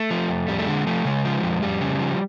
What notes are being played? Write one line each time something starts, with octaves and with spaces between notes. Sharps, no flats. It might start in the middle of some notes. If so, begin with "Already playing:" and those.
Already playing: A3
F3
F2
F2 G3
A3
D3 G#3
F3 A3
C#3 G#3
F3
F2
F2 G3
C#3
F3